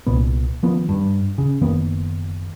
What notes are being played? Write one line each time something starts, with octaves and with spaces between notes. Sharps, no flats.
C2 A#2 B3
D#3 F3 B3
G2
C#3
F#1 D#3 A#3 B3